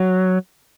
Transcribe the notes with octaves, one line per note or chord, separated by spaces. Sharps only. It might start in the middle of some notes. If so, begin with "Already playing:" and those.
Already playing: F#3